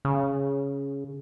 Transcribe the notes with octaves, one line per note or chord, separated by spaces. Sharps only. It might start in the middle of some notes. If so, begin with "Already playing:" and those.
C#3